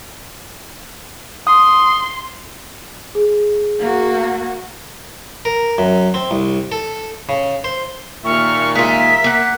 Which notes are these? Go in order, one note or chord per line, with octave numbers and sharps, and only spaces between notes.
C6 D#6
G#4
A#3 F#4
A#4
F#2
C4
C2
A4
C#3
C5
D#2 A#2 E5 C#6 F6
G#3 F4 A#4 E5 B6
A#3 F#5